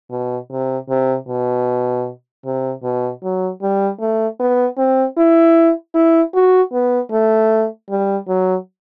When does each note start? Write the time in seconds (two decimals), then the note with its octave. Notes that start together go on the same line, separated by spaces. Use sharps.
0.11 B2
0.51 C3
0.89 C3
1.28 B2
2.45 C3
2.83 B2
3.23 F#3
3.62 G3
4.00 A3
4.40 B3
4.78 C4
5.17 E4
5.95 E4
6.35 F#4
6.73 B3
7.11 A3
7.90 G3
8.28 F#3